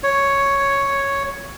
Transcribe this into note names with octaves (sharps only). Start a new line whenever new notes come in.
C#5